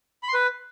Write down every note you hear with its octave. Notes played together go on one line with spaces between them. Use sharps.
B5
C6
B4